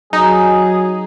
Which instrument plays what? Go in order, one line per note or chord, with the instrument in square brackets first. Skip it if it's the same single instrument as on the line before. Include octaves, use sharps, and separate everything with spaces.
[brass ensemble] F#3 G#4 [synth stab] D#4